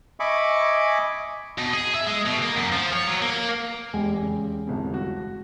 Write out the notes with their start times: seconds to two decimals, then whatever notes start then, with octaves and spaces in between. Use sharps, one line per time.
0.20 D#5 E5 G#5 B5 C#6 D6
1.58 B2
1.73 G#4
1.95 E5
2.08 G#3
2.26 B2
2.43 A#3
2.56 F#2
2.72 F3
2.93 C#5
3.07 F#3
3.22 A#3
3.94 F1 E2 G#3 G4 G#5
4.22 C#3
4.67 G1 C2 F2
4.94 F#4